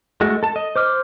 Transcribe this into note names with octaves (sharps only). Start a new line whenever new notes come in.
G#3 A3 F#4
A4 A5
D#5
C5 D6 F6